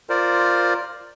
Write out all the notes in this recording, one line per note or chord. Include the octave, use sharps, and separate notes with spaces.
F4 A#4 C5 D5